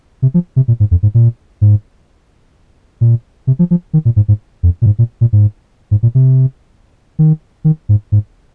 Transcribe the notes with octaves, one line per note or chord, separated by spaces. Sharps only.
C3
F3
C3
A#2
G#2
F2
G#2
A#2
G#2
A#2
C3
F3
F3
D#3
A#2
G#2
G#2
F2
A#2
G#2
A#2
A#2
G#2
G#2
A#2
C3
D#3
D#3
G#2
G#2